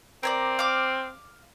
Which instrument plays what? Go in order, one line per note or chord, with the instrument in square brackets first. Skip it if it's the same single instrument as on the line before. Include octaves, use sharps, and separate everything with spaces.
[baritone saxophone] C4 [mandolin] A#4 C#5 D5
[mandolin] F5 D6